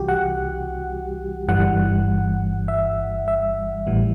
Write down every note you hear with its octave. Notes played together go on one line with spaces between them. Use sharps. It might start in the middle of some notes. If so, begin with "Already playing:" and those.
Already playing: C2 C3 E3 G3 F#4 G4
F#5
G1 G2 E3 G3 F#5
E5
E5
A1 A2 E3 G3